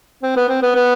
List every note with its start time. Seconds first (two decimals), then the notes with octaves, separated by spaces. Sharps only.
0.23 C4
0.36 B3
0.48 C4
0.62 B3
0.75 B3